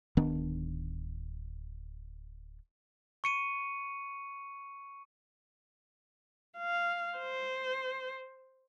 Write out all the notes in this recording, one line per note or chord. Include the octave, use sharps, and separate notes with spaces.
D1 D#3 B3 D4
C#6 C#7 D#7
F5
C5